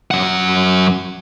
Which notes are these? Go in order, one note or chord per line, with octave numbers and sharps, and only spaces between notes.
F#2 F#5